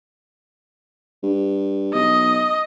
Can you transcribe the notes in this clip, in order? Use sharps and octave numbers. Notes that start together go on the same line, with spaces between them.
G2
B1 D#5